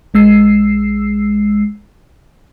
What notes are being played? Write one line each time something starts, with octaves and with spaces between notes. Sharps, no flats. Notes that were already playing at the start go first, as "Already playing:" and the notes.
A#1 G#3 E6 C7